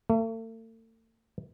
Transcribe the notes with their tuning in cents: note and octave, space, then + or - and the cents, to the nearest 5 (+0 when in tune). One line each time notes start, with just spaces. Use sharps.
A3 +40